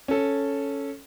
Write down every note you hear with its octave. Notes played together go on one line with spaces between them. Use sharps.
C#4 A4